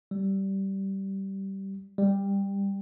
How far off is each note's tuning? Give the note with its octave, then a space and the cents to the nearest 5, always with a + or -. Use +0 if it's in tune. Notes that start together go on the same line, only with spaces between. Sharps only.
G3 -15
G3 +15